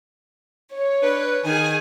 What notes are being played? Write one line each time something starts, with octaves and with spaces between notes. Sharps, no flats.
C#5
D4 B4
D#3 G#4 G#5